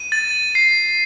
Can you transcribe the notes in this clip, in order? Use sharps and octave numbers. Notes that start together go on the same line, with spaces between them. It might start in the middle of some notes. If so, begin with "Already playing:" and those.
Already playing: D#7
A6
C7